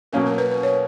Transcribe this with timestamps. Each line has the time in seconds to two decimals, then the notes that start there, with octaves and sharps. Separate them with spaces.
0.13 B2 F#3 A#3 C#4 A#4
0.26 A#4
0.38 B4
0.51 B4
0.63 C#5